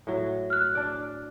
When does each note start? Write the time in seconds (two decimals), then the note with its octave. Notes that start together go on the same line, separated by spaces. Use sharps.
0.07 A2 F#3
0.50 F6 F#6
0.75 D4 D5